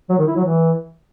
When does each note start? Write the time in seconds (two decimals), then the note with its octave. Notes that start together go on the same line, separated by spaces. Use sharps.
0.10 F#3
0.18 D#3
0.27 E4
0.36 F#3
0.45 E3